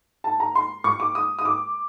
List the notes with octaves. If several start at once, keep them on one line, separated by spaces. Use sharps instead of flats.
A5
A#5
C6
C#6
D6
D#6
D#6
D6